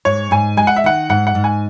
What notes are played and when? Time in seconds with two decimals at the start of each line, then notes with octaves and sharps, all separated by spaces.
0.05 G#2 C#5
0.31 G#2 G#5
0.57 G#3 G#5
0.67 F#5
0.76 E5
0.84 D#3 F#5
1.09 G#2 F#5
1.27 F#5
1.35 G#2
1.44 G#5